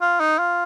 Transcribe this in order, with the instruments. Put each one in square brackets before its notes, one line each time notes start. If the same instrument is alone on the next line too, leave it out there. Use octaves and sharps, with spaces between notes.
[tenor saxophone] F4
D#4
F4